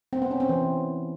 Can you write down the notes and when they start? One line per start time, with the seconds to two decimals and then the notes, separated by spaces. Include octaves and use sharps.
0.13 C4
0.22 B3
0.31 C#4
0.40 C4
0.49 E3